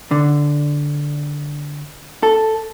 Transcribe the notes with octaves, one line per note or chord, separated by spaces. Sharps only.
D3
A4